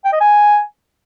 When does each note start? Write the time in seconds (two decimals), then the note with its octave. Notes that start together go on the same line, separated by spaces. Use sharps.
0.04 G5
0.12 D#5
0.20 G#5